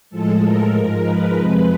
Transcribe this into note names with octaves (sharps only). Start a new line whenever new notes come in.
A2 F3 G#3 A4
A#4
G#2 F3 G#3
B4
F2 C3 F3 G#3